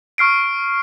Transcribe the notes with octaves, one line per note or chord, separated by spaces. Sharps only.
C#6 F6 C7 D7